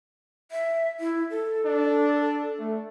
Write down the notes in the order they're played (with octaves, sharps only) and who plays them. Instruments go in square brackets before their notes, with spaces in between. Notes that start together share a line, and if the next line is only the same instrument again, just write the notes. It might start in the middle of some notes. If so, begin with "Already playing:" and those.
[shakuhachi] E5
E4
A4
[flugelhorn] D4
A3